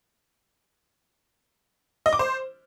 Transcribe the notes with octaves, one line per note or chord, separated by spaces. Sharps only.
D#5
D6
C5